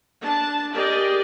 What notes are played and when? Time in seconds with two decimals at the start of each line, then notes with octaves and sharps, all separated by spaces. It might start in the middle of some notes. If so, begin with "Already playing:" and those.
0.21 D4 A5
0.72 G4 G#4 A#4 D5 D#5